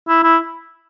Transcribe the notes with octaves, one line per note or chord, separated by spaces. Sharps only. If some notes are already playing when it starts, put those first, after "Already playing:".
E4
E4